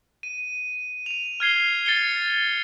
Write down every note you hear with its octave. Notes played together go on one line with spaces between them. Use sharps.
D#7
D#7 F7
F6 G#6 C7 G7
A6 C#7 G7